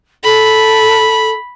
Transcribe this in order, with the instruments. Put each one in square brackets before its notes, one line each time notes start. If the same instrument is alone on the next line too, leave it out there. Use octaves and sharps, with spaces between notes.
[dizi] A4 [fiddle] B5